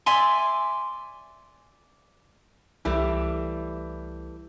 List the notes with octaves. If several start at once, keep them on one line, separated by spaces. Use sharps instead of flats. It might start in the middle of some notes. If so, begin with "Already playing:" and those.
D5 E5 G#5 C6
C2 E3 G3 A3